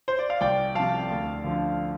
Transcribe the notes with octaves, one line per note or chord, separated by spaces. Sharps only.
C5
D5
F5
C2 D5 G5
C3 F3 F5 A5
D2
D3 F3